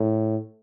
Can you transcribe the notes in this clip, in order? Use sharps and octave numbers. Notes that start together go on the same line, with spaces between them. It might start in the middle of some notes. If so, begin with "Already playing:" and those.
Already playing: A2